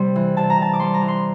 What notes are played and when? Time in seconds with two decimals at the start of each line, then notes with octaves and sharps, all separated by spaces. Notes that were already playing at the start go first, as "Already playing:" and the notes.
Already playing: C3 G3 C6
0.16 E3
0.37 C3 A5
0.50 A#5
0.58 C3 A5
0.73 D6
0.80 G3 C6
0.94 A#5
1.02 E3
1.08 C6